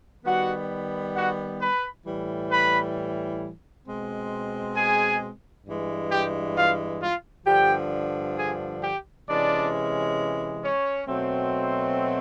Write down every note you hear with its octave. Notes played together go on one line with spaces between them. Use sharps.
D#3 G3 B3 F#4 F#5
F#4 F#5
B4 B5
A2 E3 G3
B4 B5
B2 G#3 C4
G#4 G#5
G2 E3 G#3
G4 G5
F4 F5
F4 F5
G2 D3 F3 G4 G5
G#4 G#5
G4 G5
C3 E3 G#3 C#4 D4 D5
C#4 C#5
B2 F#3 A3 C4